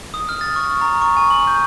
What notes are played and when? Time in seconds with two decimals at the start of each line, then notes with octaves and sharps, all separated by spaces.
0.14 D#6
0.29 F6
0.41 A6
0.56 C#6
0.81 A#5
1.02 C#6
1.17 G#5
1.30 F#7
1.47 G6